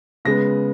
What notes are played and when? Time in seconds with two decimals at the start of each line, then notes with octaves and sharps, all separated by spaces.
0.25 C#3 G#3 B3 A#6